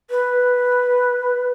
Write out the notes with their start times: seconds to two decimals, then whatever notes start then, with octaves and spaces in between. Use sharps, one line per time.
0.10 B4